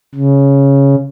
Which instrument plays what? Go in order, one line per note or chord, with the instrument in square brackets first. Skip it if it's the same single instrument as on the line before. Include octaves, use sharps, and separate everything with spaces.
[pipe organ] C#3